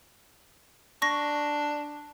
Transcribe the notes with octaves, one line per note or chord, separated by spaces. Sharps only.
D4 C#6 A#6